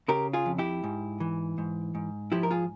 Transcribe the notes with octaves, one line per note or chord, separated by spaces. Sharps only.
C#3 G4 A#4
F4 G#4
F2
E4 G4
G#2
E3
G#2
G#2
F3 E4 G4
A#4
F4 G#4